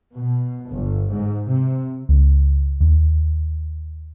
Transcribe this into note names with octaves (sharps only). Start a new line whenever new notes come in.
B2
G1
G#2
C3
C#2
D#2